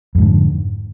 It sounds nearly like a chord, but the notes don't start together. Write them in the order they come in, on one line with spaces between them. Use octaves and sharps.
F2 G#2 D3